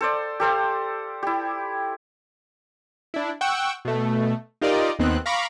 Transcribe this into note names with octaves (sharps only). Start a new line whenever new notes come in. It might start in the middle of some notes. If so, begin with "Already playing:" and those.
A4 C5 D5
G4 A4 C5 F5
E4 G4
D4 E4
F#5 G5 C#6 E6
B2 A3
D#4 F4 G4 A#4 D5 D#5
D#2 D#3 B3 C4 F#6
F5 A#5 B5 C#6 D6